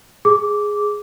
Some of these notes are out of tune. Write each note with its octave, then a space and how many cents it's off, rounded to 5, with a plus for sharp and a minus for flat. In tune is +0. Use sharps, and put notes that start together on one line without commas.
G#4 +0 D6 -10